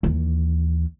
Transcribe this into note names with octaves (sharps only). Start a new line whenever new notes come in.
D#2 E3